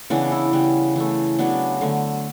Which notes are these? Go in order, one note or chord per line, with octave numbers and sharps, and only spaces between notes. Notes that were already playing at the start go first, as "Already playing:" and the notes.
C#3 E3 B3 D4
E4
C#3 G3 B3
E3 A3
C#3 F#3 B3 D4
D3 A3